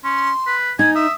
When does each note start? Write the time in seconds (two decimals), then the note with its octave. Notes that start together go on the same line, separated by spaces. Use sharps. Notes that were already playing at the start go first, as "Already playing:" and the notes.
0.04 C#4 C6
0.47 B4
0.79 D#4 G#5 G#6
0.95 E5 D#6